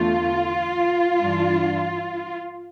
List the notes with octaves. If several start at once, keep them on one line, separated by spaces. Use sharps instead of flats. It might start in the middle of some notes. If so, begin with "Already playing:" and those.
Already playing: E2 D3 A3 F4
G2 E3 G3 D4